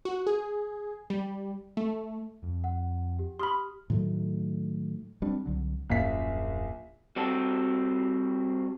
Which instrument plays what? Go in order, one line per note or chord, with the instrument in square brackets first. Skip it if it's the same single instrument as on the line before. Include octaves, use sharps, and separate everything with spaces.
[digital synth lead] F#4
G#4
G3
A3
[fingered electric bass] F2
[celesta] F#5
G4
[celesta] G4 D#6 F6 [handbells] B5 C6
[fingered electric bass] A2 D#3 F#3 A3
G3 C4 D4
C2 D3 F#3
[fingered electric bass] D#1 F#2 C#4 [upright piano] A#1 F5 B6
[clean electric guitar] G3 C4 F#4 A4